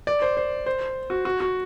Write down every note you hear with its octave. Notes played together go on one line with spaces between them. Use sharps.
D5
C5
C5
C5
F#4
F#4
F#4